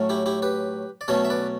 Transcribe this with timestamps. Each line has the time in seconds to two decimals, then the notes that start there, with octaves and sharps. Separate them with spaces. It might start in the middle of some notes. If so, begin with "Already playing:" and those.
Already playing: A2 F#3 A3 C#4
0.09 E4 G4
0.26 E4 G4
0.42 G4 B4
1.01 D5
1.08 B2 F#3 A3 C#4 A4 C#5
1.25 E5
1.30 B4 D5